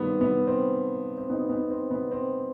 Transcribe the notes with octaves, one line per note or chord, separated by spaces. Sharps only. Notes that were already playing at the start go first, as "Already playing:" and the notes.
Already playing: G2 D#3 B3 C4
B3
C4
C4
B3 D#4
B3 D#4
C4
B3
C4